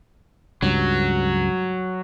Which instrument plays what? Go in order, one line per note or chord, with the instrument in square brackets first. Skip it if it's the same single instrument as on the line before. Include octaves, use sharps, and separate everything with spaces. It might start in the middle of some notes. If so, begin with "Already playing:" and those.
[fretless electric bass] C#2 G2 [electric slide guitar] F#3